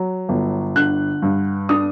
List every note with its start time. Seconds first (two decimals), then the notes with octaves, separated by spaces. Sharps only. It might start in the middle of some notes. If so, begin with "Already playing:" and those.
Already playing: F#3
0.29 G1
0.76 D3 F#6
1.22 G2
1.69 D4 D#6